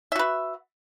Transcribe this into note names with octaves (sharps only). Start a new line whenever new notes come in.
F#4 B4 E5